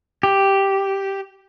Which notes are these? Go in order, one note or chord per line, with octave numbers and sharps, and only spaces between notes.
G4